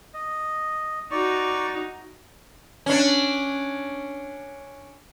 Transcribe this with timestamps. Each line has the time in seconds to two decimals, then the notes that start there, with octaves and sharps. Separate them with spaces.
0.14 D#5
1.11 D#4 F#4 D5 C#6
2.86 C#4 D4